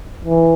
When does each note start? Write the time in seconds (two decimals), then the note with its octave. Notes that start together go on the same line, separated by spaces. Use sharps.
0.25 E3